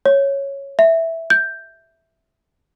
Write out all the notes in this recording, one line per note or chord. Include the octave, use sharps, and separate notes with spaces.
C#5
E5
G6